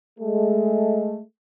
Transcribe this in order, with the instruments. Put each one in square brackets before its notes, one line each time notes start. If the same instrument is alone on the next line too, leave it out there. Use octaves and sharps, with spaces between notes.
[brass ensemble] G#3 A3